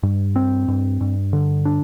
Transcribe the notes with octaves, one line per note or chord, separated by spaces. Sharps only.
G2
C4
G2
G2
D3
D4